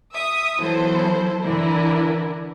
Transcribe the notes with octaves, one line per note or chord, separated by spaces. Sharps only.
E5 D#6
E3 F#3 B3 E4 A4 C5
D3 E3 D4 E4 A#4